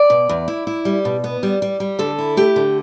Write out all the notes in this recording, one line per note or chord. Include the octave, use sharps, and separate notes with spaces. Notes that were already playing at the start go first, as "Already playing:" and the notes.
Already playing: D5
B2
E2
E4
E4
G3
B2
B3
G3
G3
G3
D3 A4
E4
A3 G4
D3